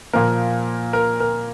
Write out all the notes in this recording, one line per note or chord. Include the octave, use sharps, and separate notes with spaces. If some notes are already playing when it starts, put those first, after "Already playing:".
A#2 F3 A#3 A#4
A#4
A#4